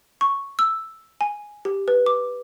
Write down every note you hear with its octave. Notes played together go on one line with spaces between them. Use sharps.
C#6
E6
G#5
G4
B4
D6